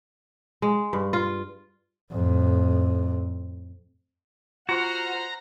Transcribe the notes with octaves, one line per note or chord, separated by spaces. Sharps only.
G#3
G2
F4
F2 A2
F4 F#4 C5 F#5 A#5 C6 F6 F#6